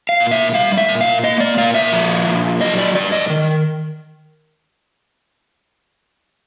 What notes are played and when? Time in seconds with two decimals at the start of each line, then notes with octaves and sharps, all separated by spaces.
0.09 F5
0.20 A#2
0.31 E5
0.54 G3 F5
0.78 E5
0.89 A#2
1.01 F5
1.23 A#3 D#5
1.40 D5
1.57 A#2 F5
1.74 E5
1.92 F3
2.27 A#2
2.61 F#3 D#5
2.78 D5
2.95 G2 D5
3.12 D#5
3.30 D#3